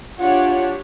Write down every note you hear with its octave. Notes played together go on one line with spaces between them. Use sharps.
D4 F4 G4 C#5 F#5